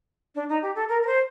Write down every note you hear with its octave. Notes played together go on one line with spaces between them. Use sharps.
D4
D#4
G4
A4
A#4
A#4
C5